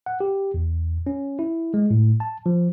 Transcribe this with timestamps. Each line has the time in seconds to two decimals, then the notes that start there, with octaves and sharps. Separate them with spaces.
0.06 F#5
0.20 G4
0.54 E2
1.07 C#4
1.39 E4
1.74 G#3
1.90 A2
2.20 A5
2.46 F3